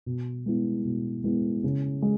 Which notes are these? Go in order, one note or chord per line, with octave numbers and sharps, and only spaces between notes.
B2
G#3 B3 E4
B2
G#3 B3 E4
C#3
G#3